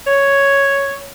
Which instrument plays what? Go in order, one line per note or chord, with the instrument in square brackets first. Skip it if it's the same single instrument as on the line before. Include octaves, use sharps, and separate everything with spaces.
[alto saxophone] C#5